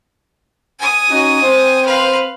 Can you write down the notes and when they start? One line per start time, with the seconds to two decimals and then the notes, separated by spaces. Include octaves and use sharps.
0.79 G#5 D#6
1.10 C#4 D#4 F#4
1.41 C4 C5
1.85 B4 F5